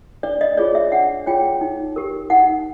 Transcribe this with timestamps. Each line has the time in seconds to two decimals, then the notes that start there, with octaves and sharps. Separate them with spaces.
0.23 D4 D5
0.41 D#5
0.57 F4 G#4 C#5 D5
0.75 E5
0.92 D4 F#5
1.26 F4 G#4 C#5 G5
1.61 D#4
1.96 G4 A#4
2.30 D#4 F#5